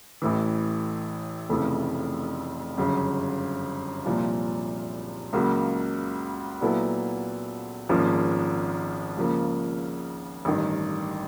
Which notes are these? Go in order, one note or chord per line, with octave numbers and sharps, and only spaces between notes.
A1 A2 E3
F1 F2 C#3 E3 A3
G1 F#2 C#3
C2 A#2 F3
C#2 C#3 F#3 A#3
A#2 F#3 B3 E4 A4
G#1 G#2 F3 A#3 C#4
C#2 C#3 F3 A#3
A1 G2 D#3